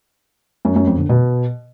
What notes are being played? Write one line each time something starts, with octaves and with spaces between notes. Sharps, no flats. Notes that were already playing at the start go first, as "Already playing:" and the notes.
F#2
F#2
F2
D3
B2